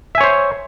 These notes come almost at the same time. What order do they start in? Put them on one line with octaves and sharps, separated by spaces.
E5 G#5 C#5 C5